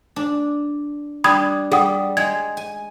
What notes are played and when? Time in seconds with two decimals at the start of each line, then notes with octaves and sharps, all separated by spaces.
0.16 D4
1.24 G3 D4 B5 D#6 G#6
1.71 G3 G#4 F#5 D#6
2.17 G#3 G#6
2.57 G#5